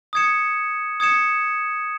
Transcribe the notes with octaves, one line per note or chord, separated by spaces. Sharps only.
D#6 G#6 C#7 E7
D#6 G#6 C#7 E7